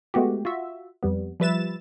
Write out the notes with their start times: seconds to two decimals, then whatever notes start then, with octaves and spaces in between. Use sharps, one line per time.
0.14 G#3 A3 B3 F#4 G4
0.45 F4 F#4 E5
1.03 F2 G3 B3
1.40 F3 G3 B4 E5 A6 E7